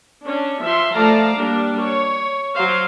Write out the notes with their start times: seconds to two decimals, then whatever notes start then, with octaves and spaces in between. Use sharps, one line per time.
0.24 C#4 D4
0.64 F3 E5 C6
0.94 F3 A3 D5 F5 A5 A#5
1.38 G3 A#3 D4 G4
1.81 C#5
2.55 F#3 C5 F5